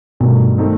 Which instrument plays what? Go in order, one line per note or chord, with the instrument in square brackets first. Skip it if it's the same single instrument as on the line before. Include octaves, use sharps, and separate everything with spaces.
[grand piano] G2 D#3 F#3 A3 [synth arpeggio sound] B2
[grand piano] D#3 A3 C4 D#4